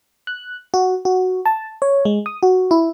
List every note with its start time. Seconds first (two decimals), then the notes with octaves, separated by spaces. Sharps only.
0.27 F#6
0.74 F#4
1.05 F#4
1.46 A5
1.82 C#5
2.05 G#3
2.26 D#6
2.43 F#4
2.71 E4